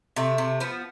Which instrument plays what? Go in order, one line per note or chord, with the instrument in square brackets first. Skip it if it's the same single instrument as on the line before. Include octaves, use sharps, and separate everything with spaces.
[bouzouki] C3 A3
C3
F3 B3